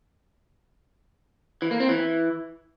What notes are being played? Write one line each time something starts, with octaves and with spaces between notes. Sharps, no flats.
E3
A#3
C4
E3